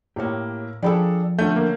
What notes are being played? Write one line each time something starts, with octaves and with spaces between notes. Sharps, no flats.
A2 A#3 G4 C#5
F3 D4 G#4 A4 G5 B5
D3 A3 C#4 E5 G6
A#3